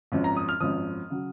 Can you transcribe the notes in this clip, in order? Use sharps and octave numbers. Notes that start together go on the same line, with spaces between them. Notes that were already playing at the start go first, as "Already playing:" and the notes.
G#1 F#2 F3
A#5
D#6
F6
G#1 F#2 F3 D#6
C#3 F#3